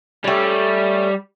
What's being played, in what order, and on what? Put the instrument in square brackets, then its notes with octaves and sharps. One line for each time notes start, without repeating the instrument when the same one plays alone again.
[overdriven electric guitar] G3 G4 [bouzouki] A3 C#4